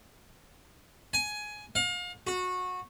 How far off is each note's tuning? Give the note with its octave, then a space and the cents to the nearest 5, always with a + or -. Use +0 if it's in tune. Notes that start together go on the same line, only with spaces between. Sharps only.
G#5 +15
F5 +35
F#4 -20